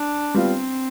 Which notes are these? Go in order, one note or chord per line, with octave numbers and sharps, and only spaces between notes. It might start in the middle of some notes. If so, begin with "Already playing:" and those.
Already playing: D4
G3 B3 C4 F4